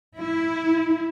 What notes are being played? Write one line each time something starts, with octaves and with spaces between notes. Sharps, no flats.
E4